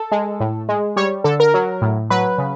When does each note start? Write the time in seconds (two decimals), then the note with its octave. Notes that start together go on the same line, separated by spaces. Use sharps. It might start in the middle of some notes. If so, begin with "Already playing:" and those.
Already playing: A4
0.12 G#3
0.40 A2
0.69 G#3
0.96 G3 C#5
1.24 D3 A4
1.40 A#4
1.54 F#3
1.81 A2
2.10 F#3 B4
2.38 C#3